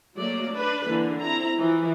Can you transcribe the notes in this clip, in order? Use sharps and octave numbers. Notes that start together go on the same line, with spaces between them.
F#3 A3 A#3 D5
D4 B4
D3 E3 A#3
C4 E4 A#5
E3 F3